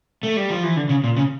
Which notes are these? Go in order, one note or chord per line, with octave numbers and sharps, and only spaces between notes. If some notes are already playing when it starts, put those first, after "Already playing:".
A3
G3
F3
E3
D3
C#3
A#2
C#3